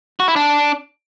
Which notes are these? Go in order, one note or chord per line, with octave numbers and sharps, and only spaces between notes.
F#4
E4
D4